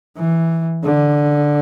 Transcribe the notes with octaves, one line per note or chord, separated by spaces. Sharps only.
E3
D3